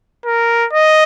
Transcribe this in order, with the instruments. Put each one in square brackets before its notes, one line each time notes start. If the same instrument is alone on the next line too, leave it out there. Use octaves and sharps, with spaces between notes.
[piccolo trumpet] A#4
D#5